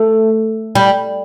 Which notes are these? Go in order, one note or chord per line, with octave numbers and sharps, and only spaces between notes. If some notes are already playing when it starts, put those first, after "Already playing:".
Already playing: A3
G3